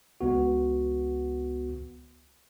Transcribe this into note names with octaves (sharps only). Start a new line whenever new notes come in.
C#2 B3 F#4